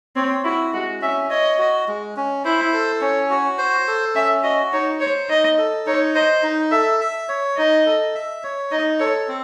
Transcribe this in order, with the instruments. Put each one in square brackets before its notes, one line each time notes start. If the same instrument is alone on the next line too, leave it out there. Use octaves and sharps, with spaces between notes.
[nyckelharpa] C4 [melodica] C#5
[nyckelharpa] E4 [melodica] F#4
[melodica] G#3 [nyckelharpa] F#4
[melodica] C#4 [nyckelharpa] E5
[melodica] C#5 [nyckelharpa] D#5
[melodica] F#4
G#3
C#4
[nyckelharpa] E4 [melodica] C5
[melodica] A4
[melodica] C#4 [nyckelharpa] C#5
[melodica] F#4
C5
A4
[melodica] C#4 [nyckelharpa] E5
[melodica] F#4 [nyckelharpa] D#5
[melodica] D#4 [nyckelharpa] C#5
[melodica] C5 [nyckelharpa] C#5
[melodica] D#4 [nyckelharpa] D#5
[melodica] A4
[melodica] D#4 [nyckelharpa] C#5
[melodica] C5 [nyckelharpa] D#5
[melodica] D#4
[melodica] A4 [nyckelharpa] E5
[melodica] E5
C#5
[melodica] D#4 [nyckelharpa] D#5
[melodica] A4
E5
C#5
[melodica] D#4 [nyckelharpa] D#5
[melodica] A4 [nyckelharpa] C#5
[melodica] C4